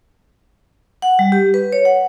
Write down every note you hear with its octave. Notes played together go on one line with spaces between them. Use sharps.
F#5
G3
G4
B4
C#5
F#5